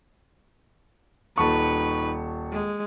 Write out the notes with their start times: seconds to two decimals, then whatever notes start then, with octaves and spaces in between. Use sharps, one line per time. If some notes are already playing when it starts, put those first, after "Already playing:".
1.38 D#1 D#4 B4 A5 C#6
2.52 G#3